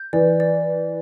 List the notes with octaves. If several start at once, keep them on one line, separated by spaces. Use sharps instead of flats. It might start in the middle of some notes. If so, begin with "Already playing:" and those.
Already playing: G6
E3 D5
D5